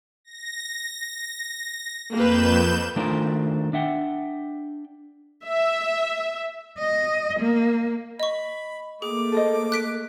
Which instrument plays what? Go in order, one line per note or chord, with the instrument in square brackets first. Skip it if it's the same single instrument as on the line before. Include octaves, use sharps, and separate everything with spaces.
[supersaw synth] A#6
[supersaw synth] F2 G6 E7 [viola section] A#3 B4
[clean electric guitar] D#3 A3 D4 F4 A#4 C5
D4 E5 F#5 G5
[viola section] E5
[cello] D#5
A#3
[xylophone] D#5 C#6 [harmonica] B5
[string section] A3 A#3 [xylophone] G#4 [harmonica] D6
[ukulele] A4 C5 D#5
[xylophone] F#6 B6 D7